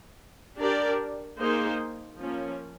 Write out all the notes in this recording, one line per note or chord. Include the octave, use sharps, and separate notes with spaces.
D4 G4 A#4 D5
A#3 D#4 G#4 C5
F3 A#3 C#4